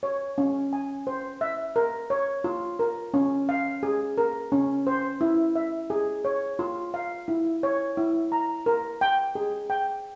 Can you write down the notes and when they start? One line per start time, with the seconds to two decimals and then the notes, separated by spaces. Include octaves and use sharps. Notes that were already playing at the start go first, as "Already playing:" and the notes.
0.03 C#5
0.38 C#4
0.73 G#5
1.07 C5
1.41 E5
1.76 A#4
2.10 C#5
2.44 F4
2.79 A#4
3.14 C#4
3.49 F5
3.83 G#4
4.18 A#4
4.52 C#4
4.87 C5
5.21 E4
5.56 E5
5.90 G#4
6.25 C#5
6.59 F4
6.94 F5
7.28 E4
7.63 C#5
7.97 E4
8.32 A#5
8.66 A#4
9.01 G5
9.35 G#4
9.70 G5